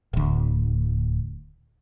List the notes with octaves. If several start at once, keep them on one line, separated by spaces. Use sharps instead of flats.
D1 D2